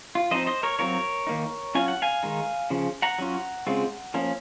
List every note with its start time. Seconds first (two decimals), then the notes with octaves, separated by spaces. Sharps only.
0.15 F4
0.31 F3 C4 D#4 C5 D#5
0.47 C5 D#5
0.63 A#4 C#5
0.79 F#3 C4 F4 A#4 C#5
1.27 D#3 A#3 D#4
1.75 F#3 C#4 F4 G#5
1.88 F#5
2.02 F5 G#5
2.23 D#3 G#3 D#4
2.70 C#3 F3
3.02 F#5 A#5
3.19 F#3 C#4 F4
3.67 C#3 G#3 C4 F4
4.14 F3 A#3 C#4